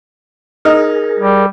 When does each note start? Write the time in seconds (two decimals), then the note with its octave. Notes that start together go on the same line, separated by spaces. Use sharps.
0.65 D#4 G#4 A#4
1.20 G3